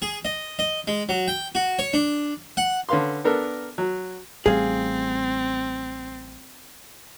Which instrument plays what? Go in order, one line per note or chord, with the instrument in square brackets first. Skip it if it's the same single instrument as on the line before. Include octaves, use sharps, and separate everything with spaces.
[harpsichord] G#4
D#5
D#5
G#3
F#3
G5
F#4
C#5
D4
F#5
[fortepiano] D3 C#4 B4 F5 C6
B3 D4 A4 A#4
F#3
[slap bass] A1 G3 A3 [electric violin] C4 [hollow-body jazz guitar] G#4 F5